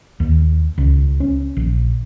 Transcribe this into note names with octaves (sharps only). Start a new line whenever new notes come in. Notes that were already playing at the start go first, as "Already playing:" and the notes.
D#2
C#2
C#4
A#1